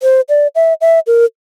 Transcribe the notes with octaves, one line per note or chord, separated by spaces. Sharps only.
C5
D5
E5
E5
A#4